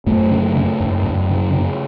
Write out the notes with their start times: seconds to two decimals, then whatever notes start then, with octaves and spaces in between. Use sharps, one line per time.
0.06 F#2 A3
0.31 C#3
0.57 C#3
0.80 F#2
1.05 F#2
1.30 C#3
1.53 C#3